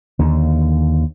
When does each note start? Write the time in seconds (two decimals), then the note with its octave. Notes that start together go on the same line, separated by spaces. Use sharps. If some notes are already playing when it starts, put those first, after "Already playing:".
0.19 D#2 D3